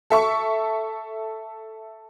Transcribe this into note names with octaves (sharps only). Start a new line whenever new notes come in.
A4 E5 C#6